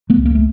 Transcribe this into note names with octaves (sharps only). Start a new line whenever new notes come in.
A3 B3
C#2
A#3
A3